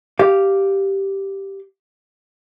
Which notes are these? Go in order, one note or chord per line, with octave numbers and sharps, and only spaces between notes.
G4 F5